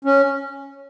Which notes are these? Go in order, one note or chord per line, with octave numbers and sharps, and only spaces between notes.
C#4